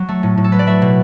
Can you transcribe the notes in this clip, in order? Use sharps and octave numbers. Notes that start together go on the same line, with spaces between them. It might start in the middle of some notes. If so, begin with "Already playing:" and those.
Already playing: F#3
A3
A2
A2
A4
F#3 B4
D5
A3 E5
B2